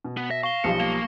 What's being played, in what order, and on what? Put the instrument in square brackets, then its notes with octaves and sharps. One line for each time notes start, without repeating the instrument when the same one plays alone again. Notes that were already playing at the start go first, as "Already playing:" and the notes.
[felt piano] B2
[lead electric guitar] B3
[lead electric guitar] E5 [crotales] A#6
[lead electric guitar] F5 [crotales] C#6 G7
[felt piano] B1 F3 G3 [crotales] C#7
[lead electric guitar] A#3